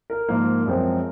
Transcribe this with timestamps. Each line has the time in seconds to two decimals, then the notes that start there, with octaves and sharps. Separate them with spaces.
0.10 A#4
0.29 G#2 F3 A#3
0.66 F#2 F3 G#3 C4